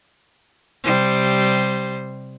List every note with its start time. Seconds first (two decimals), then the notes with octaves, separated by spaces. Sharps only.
0.84 C3 G3 C5